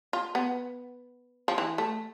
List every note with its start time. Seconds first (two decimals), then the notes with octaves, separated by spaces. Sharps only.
0.13 F4
0.35 B3
1.48 F3
1.58 E3
1.78 A3